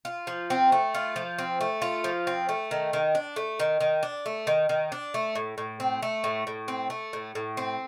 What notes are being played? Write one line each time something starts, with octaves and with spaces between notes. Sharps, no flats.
F4
F3
C4
A3
F4
F3
C4
A3
F4
F3
C4
A3
D#3
D#3
D4
A3
D#3
D#3
D4
A3
D#3
D#3
D4
A3
A2
A2
C4
A3
A2
A2
C4
A3
A2
A2
C4